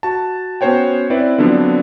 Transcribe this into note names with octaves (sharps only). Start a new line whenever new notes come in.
F#4 A5
B3 C#4 F#4 C5 C#5 G5
C4 E4 B4 D5
D3 F3 F#3 B3 C4 D4